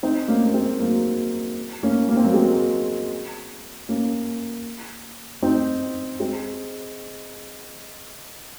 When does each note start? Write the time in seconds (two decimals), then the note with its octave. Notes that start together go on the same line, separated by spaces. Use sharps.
0.03 C4 D#4
0.28 A#3 C#4
0.46 A#3
0.54 G#3 C4
0.80 F#3 A#3
1.83 A#3 C#4
2.09 A#3
2.17 C4
2.25 F#3 A#3
2.34 G#3 C4
3.89 A#3 C#4
5.43 C4 D#4
6.20 G#3 C4